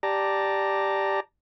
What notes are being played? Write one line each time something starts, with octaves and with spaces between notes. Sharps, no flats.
G4 D5 A5 A#5